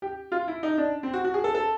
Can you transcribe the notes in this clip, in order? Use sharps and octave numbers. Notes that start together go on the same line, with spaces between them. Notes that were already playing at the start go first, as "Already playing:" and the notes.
G4
F4
E4
D#4
D4
C4
F#4
F#4
G#4
A4
A4